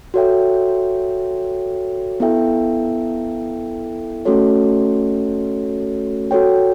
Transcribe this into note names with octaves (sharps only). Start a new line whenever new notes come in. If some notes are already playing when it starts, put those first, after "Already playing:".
F#4 A4 C#5 E5 G5
B3 E4 A4 E5 G5
A3 C#4 F#4 A4 C#5
F#4 A4 C#5 G5